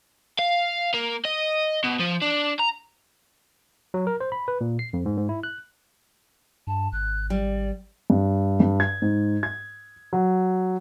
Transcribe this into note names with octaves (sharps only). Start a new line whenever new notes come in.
F5
A#3
D#5
B2
F3
D4
A#5
F#3
A#4
C5
B5
B4
A#2
C7
F2
G#2
G#2
E4
F#6
G2 A5
G#1 F#6
G3 D5
G2
G2
G#6
G#2
G#6
F#3